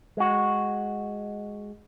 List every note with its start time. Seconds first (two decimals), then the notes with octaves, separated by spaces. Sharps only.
0.17 G#3 F#4